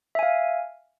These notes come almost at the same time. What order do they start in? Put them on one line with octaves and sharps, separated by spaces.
E5 G#5 F5